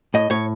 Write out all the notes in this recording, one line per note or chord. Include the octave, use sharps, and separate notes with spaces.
A2 D#5
A2 C#5